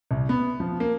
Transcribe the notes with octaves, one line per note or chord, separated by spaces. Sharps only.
C2
B3
F3
A#3